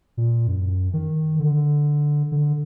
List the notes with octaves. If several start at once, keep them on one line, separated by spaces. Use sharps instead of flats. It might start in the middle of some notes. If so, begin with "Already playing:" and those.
A#2
F#2
D#3
D3
D3